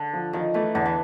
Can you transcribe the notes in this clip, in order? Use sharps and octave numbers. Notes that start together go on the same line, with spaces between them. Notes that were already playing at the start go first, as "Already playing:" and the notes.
Already playing: D3
F3
D#3 F3
E3 A3
E2 D3
E3